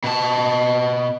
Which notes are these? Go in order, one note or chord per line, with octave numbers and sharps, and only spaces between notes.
B2 A5